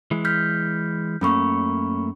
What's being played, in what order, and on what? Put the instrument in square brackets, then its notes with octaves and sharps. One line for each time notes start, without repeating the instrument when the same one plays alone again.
[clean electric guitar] E3 G#3
[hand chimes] F6 G6 B6
[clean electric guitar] F#2 A3 A#3 [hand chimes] C#4 B5 C#6